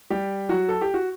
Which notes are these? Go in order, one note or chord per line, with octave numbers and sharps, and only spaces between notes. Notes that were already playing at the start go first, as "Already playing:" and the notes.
G3 G4
F#3 F#4
A4
G4
F#4